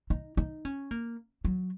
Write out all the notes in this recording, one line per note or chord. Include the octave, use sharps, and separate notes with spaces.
D#4
D#4
C#4
A#3
F#3